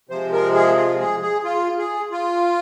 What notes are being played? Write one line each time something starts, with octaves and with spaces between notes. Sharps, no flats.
C3 F3 G#3 C5
A#4
G#4
F4
G#4
G#4
F4
G#4
F4